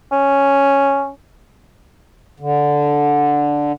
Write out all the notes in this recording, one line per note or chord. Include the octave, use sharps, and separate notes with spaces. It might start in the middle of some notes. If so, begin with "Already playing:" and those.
C#4
D3